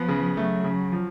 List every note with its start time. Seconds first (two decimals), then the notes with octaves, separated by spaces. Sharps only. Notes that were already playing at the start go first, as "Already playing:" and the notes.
Already playing: F3 B3
0.08 C#3
0.36 F#3 A3
0.64 C#3
0.92 F3